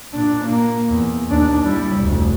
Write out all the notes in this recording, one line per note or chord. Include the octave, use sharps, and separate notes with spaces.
A#2 D4
A#3
E2
D#2 D4
G3 E4
F1 D2